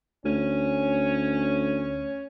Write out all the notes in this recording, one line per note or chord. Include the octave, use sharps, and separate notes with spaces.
D2 C#4